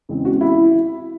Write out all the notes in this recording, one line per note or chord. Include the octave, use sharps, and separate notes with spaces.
E2 C#3 G#3 C4
F#4
E4